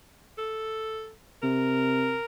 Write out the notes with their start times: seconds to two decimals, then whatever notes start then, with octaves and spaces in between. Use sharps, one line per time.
0.38 A4
1.43 C3 A#4